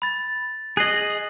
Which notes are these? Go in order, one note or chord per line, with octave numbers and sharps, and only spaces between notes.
B5 A6
G#4 D#5 F#6 C7 F#7